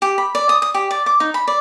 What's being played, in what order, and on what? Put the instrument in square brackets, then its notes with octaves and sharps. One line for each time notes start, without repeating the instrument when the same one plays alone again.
[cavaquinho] G4
B5
D5
D#6
D#6
G4
D5
D6
D#4
B5
D5